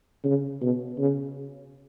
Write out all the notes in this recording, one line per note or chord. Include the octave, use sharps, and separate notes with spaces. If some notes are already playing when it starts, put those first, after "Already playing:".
C#3
B2
C#3